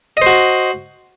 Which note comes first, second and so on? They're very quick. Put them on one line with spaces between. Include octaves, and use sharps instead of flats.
D#5 C5 F#4